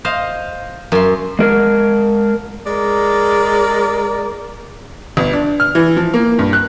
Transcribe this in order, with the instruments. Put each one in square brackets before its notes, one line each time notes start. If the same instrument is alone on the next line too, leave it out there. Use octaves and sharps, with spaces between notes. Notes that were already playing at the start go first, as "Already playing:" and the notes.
[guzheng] C5 D#5 F5
F#2 C6
[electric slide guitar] G#3 A#4
[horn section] G#3 A#4 D5
[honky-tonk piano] G1
D4
F6
E3
F3
A#3
G2
F#6